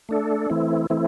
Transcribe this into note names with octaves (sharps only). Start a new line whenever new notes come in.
A3 D4 A4
E3 A3 C4 E4
E3 A3 C4 E4